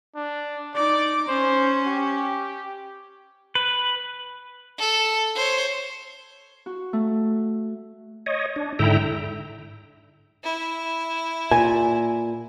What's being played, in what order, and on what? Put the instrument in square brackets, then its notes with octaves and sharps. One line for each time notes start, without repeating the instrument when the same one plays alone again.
[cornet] D4
[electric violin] D#4 D6 [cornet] D5
[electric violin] C#4 [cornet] C5
[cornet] G4
[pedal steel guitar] B4
[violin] A4
C5 C#5
[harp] F#4
A3
[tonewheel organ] C#5 D#5
D4
G#2 D3 E4 E5 G5 A#5
[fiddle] E4
[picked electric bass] A#2 [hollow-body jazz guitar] G#5